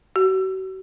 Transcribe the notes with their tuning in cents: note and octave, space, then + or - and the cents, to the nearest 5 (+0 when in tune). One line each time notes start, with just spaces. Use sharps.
F#4 +40